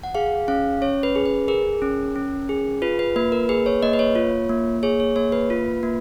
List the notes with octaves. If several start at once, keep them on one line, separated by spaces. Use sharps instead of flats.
F#5
G#4 F5
C#4 F5
C#4 C#5
B4
G#4
B4
G#4 A#4
C#4
C#4
G#4
F4 B4
B4
A#3 B4
A#4
G#4 B4
C#5
A#3 D#5
B4
C#5
F4
A#3
G#4 C#5
C#5
A#3 C#5
B4
F4
A#3